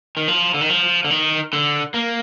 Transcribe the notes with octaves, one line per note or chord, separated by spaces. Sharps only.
D#3
F3
D3
D#3
F3
D3
D#3
D3
A#3